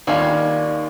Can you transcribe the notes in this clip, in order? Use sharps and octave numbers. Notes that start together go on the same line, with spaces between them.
D#2 D#3 G3 A#3 C#4 F4